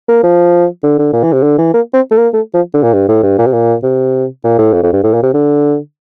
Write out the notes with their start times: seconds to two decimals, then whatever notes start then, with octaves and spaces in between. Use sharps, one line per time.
0.08 A#3
0.23 F3
0.83 D3
0.99 D3
1.13 A#2
1.23 E3
1.33 C3
1.42 D3
1.58 E3
1.74 A#3
1.93 C4
2.11 A3
2.17 A#3
2.33 A3
2.53 F3
2.74 D3
2.83 A#2
2.93 G2
3.08 A2
3.23 G2
3.38 A#2
3.46 C3
3.53 A#2
3.83 C3
4.44 A#2
4.59 A2
4.73 F2
4.83 F2
4.93 G2
5.03 A2
5.14 A#2
5.23 C3
5.34 D3